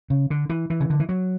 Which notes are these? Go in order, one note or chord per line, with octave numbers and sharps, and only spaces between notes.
C#3
D3
E3
E3
C#3
D3
E3
F#3